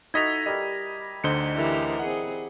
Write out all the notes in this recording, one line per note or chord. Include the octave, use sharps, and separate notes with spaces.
D#4 E4 F#4 A4 D#5 G#6 B6 F7
G3 A#4 D#5
D2 D3 D#4 C5 C#7 G7
E3 G4 A#4
C4 G#4 F#5